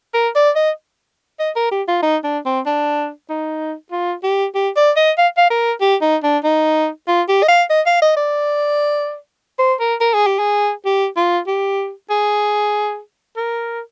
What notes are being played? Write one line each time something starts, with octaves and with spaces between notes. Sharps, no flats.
A#4
D5
D#5
D#5
A#4
G4
F4
D#4
D4
C4
D4
D#4
F4
G4
G4
D5
D#5
F5
F5
A#4
G4
D#4
D4
D#4
F4
G4
D#5
F5
D#5
F5
D#5
D5
C5
A#4
A#4
G#4
G4
G#4
G4
F4
G4
G#4
A#4